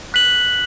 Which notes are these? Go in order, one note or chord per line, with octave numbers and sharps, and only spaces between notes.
F#6 B6 F#7